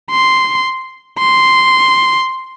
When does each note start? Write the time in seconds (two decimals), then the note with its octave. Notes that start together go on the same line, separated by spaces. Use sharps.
0.10 C6
1.19 C6